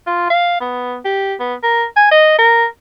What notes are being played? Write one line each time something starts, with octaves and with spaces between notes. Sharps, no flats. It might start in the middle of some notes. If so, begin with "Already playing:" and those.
F4
F5
B3
G4
B3
A#4
G#5
D#5
A#4